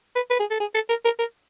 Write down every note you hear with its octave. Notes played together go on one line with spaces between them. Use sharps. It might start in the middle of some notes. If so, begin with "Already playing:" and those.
B4
B4
G#4
A4
G#4
A4
A#4
A#4
A#4